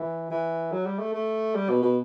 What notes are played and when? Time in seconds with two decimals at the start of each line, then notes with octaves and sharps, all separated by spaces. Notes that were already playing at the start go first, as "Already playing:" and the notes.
Already playing: E3
0.30 E3
0.72 F#3
0.85 G3
0.99 A3
1.13 A3
1.55 G3
1.69 B2
1.82 B2